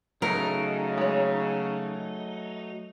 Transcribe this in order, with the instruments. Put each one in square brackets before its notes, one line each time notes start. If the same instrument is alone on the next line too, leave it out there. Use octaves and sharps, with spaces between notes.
[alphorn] C#3 [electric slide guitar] F#3 A3 D#4 [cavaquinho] A#4
[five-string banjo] G#3 C#5